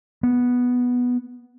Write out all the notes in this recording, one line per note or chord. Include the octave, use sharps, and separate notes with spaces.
B3